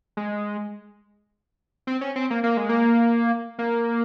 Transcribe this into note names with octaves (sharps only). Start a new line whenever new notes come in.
G#3
C4
C#4
C4
A#3
A#3
G#3
A#3
A#3